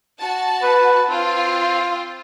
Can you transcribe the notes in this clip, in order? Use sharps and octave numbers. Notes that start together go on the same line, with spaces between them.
F#4 A5
B4
C4 F4